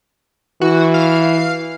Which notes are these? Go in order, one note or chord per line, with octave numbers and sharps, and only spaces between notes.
E3 F#4
F5